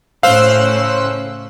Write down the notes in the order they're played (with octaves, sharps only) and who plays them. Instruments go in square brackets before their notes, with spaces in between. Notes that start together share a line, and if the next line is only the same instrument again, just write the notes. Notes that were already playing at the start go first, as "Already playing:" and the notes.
[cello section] A2 C#3 C#4 [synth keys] C5 E6 F#6 [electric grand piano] F5